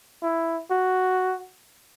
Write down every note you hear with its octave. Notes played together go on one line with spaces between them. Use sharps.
E4
F#4